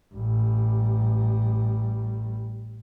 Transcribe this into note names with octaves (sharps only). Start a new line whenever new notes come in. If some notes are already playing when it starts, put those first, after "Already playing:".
A1 G3